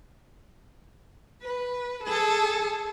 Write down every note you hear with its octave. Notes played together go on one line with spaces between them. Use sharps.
B4
G#4 A4